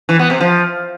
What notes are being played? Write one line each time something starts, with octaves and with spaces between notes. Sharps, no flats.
E3
B3
C3
F3